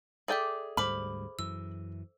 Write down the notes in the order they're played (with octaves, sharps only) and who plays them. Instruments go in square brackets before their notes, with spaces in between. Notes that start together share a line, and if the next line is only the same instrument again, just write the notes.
[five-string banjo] G#4 D5 G5 [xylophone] A4 E5
[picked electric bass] D2 G#2 G3 [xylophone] C5 D6 F6 [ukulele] B5
[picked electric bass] F#2 E3 [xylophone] E6